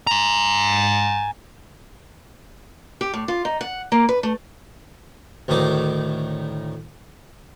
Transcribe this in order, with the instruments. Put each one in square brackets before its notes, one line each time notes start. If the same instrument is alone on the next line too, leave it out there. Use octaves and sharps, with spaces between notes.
[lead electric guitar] G#5 A#5
[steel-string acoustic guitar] G4
A2
F4
D#4
F#5
A#3
B4
A3
[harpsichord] D2 A2 D#3 D#4 D6